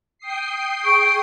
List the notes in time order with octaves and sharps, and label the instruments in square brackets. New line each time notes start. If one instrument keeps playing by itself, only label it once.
[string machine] G5 D#6 C7
[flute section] G#4 C#6 [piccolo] D7